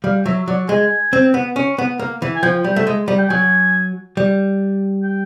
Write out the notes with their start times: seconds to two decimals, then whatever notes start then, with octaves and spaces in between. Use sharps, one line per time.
0.04 G3 F5
0.26 F#3 E5
0.48 F#3 D5
0.69 G#3 G#5
1.13 C4
1.34 B3
1.56 C#4
1.78 B3
1.99 A#3
2.22 E3
2.36 G#5
2.43 F3 G5
2.64 G3
2.76 A3
2.87 G#3
3.08 G3
3.18 G5
3.30 F#3 G#5
4.17 G3
5.03 G5